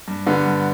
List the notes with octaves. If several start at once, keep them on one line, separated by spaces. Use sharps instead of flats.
G2
D3 G3 B3
G2